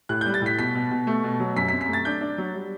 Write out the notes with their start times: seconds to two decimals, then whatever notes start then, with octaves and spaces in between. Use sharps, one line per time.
0.09 A2 F#6
0.21 G6
0.26 G3
0.34 A6
0.42 A2 B6
0.58 B2 B6
0.75 B2
0.91 B2
1.07 A3
1.24 B2
1.40 F#3
1.56 F#2 B6
1.68 B6
1.72 C4
1.81 B6
1.88 A3 A6
2.05 D4 G6
2.21 D4
2.38 F#3
2.54 G3